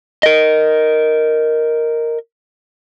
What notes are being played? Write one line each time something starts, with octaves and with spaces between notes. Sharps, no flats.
A#4 D#5